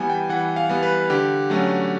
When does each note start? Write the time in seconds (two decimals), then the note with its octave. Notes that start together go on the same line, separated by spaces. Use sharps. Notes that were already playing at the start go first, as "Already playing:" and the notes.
Already playing: E3 G3 B3 G#5
0.10 G5
0.29 E3 F#5
0.56 F5
0.69 G3 B3
0.83 B4
1.10 D3 G4
1.50 F#3 A3 C#4